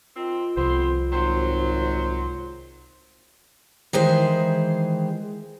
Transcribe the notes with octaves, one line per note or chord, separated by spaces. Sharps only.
D#3 C4 F4
C2 F2 B3 C4 C5
G#1 F#3 C5
D#3 E3 G#3 C5